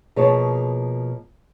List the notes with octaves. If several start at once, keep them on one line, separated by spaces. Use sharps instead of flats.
B2 F3 A#3 G#4 C#5 A5